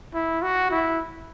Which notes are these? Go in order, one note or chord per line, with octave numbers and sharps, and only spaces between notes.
E4
F#4
E4